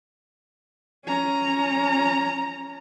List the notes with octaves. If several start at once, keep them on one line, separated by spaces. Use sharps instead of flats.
C#4 A#5